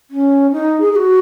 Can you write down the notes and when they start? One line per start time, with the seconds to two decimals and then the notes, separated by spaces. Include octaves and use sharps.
0.10 C#4
0.52 D#4
0.80 G#4
0.92 G#4
0.96 F#4